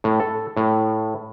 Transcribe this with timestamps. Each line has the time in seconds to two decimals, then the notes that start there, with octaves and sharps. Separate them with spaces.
0.04 A2
0.20 A4
0.57 A2